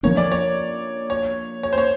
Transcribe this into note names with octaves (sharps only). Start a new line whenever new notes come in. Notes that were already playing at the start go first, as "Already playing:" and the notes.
F3 A#3 D4 C#5
D5
C#5
C#5
C#5
C5
C#5